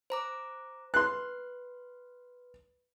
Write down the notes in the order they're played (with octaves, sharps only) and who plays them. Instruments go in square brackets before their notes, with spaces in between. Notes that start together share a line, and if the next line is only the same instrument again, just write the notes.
[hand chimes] C5 A#5 D6
[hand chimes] B4 [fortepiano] C6 F#6